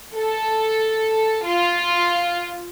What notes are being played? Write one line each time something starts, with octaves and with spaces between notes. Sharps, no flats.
A4
F4